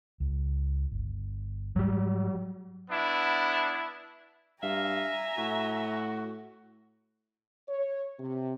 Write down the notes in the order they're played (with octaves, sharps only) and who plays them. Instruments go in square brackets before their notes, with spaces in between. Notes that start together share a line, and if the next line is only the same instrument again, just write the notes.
[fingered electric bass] C#2
G1
[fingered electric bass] G#2 [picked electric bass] F#3 G3
[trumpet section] B3 D4 E4
[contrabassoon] G2 [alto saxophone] E5 [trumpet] F5 [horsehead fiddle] G#5 A#5
[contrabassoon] A2 [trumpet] F#4
[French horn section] C#5
C3